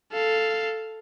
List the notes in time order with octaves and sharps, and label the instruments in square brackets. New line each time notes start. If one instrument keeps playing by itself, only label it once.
[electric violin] A4 F5